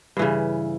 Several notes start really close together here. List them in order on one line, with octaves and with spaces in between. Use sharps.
G2 E3 C#3